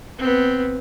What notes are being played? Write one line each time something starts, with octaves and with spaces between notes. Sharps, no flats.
B3 C4